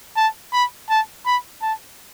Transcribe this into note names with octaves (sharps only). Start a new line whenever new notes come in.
A5
B5
A5
B5
A5